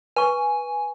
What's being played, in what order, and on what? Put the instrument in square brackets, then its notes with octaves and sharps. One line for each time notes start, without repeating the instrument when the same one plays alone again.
[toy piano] B4 C#6 [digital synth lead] G#5